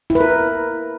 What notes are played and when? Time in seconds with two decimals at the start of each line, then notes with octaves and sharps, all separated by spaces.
0.10 E4
0.15 B4
0.21 A#4